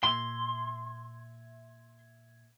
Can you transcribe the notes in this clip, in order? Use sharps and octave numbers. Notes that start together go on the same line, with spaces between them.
A#2 E5 C6 G#6